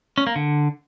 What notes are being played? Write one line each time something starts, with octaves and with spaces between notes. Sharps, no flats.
C#4
A#3
D3